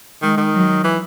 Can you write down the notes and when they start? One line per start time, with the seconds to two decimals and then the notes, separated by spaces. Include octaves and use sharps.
0.22 D#3 G#3
0.38 D#3
0.54 F#3
0.84 E3